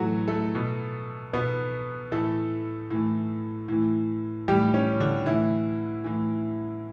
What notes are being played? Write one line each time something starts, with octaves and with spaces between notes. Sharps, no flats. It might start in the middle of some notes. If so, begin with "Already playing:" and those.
Already playing: A2 E3 F#3 A3 F#4
A3 A4
B2
B2 B3 B4
A2 E3 A3 A4
A2 E3
A2 E3
A2 E3 G3 G4
C#4
D3 D4
A2 E3 E4
A2 E3